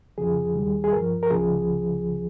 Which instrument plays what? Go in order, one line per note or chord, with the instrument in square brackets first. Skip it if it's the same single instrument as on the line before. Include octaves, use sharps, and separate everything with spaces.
[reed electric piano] F2 C#3 F3 G#4
D#2 D#3 G3
G#4
G2 F3 A#4
A#4
C#2 C#3 F3 G#4